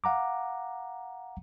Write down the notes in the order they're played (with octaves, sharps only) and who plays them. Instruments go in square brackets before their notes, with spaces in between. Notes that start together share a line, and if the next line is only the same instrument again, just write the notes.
[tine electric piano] F5 F#5 A#5 D6